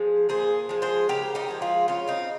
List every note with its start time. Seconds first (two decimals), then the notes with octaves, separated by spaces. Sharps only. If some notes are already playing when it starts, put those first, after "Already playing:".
Already playing: F3 G#3 G#4
0.29 A#2 G#4 C5
0.69 F3 G#3
0.82 G#4 C5
1.09 C#3 G4 A#4
1.35 D#4 G4
1.48 F3 G#3
1.62 F4 G#4
1.88 C#3 C#4 F4
2.08 C4 D#4